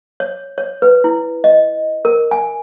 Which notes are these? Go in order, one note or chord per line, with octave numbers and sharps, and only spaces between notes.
C#5
C#5
B4
E4
D#5
A#4
G#5